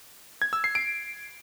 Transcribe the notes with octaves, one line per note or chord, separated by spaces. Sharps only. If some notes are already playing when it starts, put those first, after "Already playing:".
G#6
E6
C7
D7